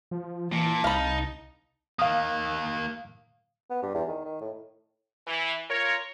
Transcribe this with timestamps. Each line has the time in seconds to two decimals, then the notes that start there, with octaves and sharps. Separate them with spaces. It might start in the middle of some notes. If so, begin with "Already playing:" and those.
0.11 F3
0.53 A#2 E3 A5
0.84 C2 D#4 F5 B5
1.99 D#3 A#3 F5 D#6
3.70 B3
3.83 G2
3.94 E2
4.09 D#3
4.25 D#3
4.41 A2
5.27 E3
5.70 F4 A#4 C#5